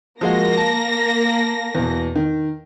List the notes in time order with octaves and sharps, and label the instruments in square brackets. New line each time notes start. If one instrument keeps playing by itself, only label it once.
[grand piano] F3 G#3 F#4 [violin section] A#3 A#6
[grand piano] A5
E2 B2
D#3